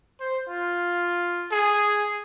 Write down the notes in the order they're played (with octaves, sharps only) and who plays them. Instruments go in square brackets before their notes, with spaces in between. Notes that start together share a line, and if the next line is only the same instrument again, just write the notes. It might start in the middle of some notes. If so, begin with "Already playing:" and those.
[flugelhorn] C5
F4
[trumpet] G#4